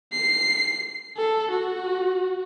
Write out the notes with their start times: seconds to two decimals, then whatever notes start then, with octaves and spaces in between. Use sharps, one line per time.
0.12 C7
1.17 A4
1.51 F#4